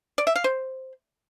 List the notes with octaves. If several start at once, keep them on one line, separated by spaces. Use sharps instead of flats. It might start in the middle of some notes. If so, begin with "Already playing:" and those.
D5
E5
F5
C5